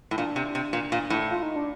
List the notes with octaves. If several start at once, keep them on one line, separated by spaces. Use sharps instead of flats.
A2
A#2 D4
C3
C3
A#2
A#2
A2
F4
D#4
D4